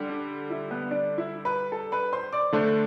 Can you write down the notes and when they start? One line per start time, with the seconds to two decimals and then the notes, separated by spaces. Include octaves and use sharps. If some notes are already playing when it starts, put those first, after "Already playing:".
Already playing: D3 G3
0.09 D4 D5
0.50 E4 E5
0.71 B3 B4
0.91 D4 D5
1.18 E4 E5
1.45 B4 B5
1.72 A4 A5
1.92 B4 B5
2.13 C5 C6
2.33 D5 D6
2.53 D3 A3 D4 C5 C6